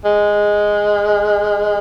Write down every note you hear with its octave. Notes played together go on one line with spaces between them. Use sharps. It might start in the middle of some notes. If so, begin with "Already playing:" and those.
G#3